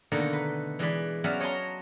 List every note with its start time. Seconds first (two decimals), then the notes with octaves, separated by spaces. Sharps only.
0.12 B2 D3 D#3 A3 A#3
0.33 B4
0.79 E3 G#3 G#4 B4 D5 B5
1.24 F#3 B3 C#4 D5 E5 F5
1.41 C#5 D#5 F#5 A5 A#5 C6